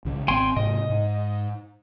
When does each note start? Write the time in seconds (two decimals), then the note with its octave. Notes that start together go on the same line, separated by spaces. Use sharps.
0.05 C2 C#3
0.28 G#1 C4 G5 G#5 C6
0.56 G#2 C3 D#5
0.90 G#2